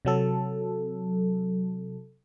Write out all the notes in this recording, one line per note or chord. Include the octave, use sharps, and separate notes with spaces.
C3 F#3 A4